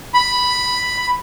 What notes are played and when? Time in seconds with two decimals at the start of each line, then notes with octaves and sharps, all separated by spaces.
0.14 B5